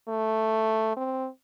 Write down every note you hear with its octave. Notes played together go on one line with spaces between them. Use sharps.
A3
C4